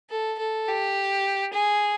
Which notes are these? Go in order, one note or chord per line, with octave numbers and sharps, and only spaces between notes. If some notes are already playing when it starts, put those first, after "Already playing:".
A4
A4
G4
G#4